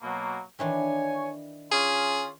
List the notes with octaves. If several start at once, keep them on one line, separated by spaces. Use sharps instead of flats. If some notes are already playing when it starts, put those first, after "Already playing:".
B2 F#3 A#3
D#3 E3 D4 C#5 G#5
C#4 F4 G#4